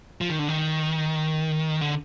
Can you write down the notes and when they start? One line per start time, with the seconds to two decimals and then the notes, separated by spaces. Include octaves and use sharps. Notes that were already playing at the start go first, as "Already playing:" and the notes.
0.21 F3
0.30 D#3
0.39 D3
0.49 D#3
1.81 D3